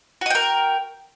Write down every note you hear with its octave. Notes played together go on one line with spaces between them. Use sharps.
F#4 A#4 D#5 G5